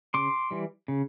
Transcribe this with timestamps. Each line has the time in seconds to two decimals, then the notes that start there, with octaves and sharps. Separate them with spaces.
0.14 C#3 C6 D6
0.51 E3 G3
0.88 C#3